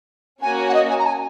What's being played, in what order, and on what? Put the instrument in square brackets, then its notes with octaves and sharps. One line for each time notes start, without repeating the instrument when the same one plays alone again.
[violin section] A#3 C#4 F#4 C#5 [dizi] G#5
[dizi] F#5
D#5
G#5
A#5
G#5